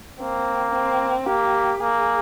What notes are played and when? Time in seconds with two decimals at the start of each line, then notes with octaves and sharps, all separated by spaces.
0.20 A#3 C4
0.74 C4
1.27 A#3 G4
1.80 A#3 G#4